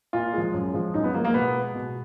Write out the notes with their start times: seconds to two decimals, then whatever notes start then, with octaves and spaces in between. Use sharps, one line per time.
0.13 A#2 F4
0.33 F3 G#3
0.54 F#2
0.74 F3 G#3
0.94 F#2 D#4
1.04 B3
1.14 F3 G#3 A#3
1.25 A#3
1.34 B2 B3
1.55 G#3
1.75 B2